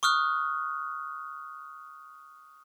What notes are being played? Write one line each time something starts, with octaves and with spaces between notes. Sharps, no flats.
C#6 D#6 F6 F#6